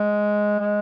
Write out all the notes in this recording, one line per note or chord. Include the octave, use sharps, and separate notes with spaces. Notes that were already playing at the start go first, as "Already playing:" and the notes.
Already playing: G#3
G#3